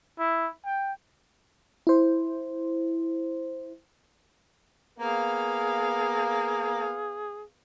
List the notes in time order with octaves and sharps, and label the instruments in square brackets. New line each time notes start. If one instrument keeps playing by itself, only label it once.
[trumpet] E4
G5
[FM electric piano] E4 C5
[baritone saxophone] A#3 [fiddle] B3 F5 [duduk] G#4